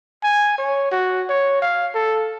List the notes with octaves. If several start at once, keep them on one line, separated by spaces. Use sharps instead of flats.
G#5
C#5
F#4
C#5
F5
A4